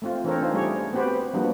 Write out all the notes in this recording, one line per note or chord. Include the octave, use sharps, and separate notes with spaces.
A3 C4 F4
E3 C4 D4 A4 A#4 C#5
C#4 D#4 F4 C5
G3 A3 C#4 G4 G#4 C#5
B3 C4 F#4 G4 B4 C5
F3 G3 A#3 B3 D4 F#4